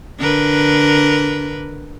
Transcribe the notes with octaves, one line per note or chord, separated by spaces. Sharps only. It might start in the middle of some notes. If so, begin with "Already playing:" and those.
D3 A#4 B4